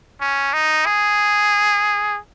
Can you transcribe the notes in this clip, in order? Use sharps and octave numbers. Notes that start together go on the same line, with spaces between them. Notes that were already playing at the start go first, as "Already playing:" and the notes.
C#4
D#4
G#4